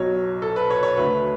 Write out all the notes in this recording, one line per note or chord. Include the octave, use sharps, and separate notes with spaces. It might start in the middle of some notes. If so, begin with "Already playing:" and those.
Already playing: B1 B2 F#3 C#5
A4
B4
C#5
C#5
D2 D3 A3 B4